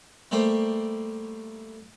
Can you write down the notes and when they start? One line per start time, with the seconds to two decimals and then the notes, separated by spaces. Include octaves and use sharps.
0.31 G3 A3 A#3 G4 C5